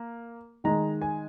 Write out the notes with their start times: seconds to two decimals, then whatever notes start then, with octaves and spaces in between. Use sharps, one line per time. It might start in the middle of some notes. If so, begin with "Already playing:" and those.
Already playing: A#3
0.64 D#3 G#3 A#5
1.02 G#5